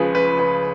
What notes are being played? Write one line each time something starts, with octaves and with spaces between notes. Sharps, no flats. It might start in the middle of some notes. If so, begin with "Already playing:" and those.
Already playing: C#2 C#3 F3 G#4 B4
B4
B4